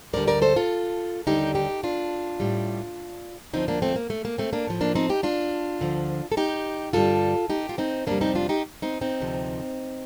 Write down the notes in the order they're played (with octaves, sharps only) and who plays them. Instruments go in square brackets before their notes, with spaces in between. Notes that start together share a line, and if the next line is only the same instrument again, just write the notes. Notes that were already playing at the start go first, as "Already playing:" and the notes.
[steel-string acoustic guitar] D2 D3 G3 A#4 D5
A#4 D5
A4 C5
F4 A4
D#2 D3 G3 D#4 G4
D#4 G4
D4 F4
A2 G3
D2 D3 F3 C4 D#4
A#3 D4
A3 C4
A#3
A3
A#3
A3 C4
A#3 D4
A2 F3
A#3 D4
C4 D#4
D#4 G4
D4 F4
D2 D3 F3
A4
D#4 G4
G2 D3 G3 F4 A4
D#4 G4
F4
C4 D#4
F2 C3 G3 A#3 D4
C4 D#4
D4 F4
D#4 G4
C4 D#4
C4 D#4
D2 C3 F3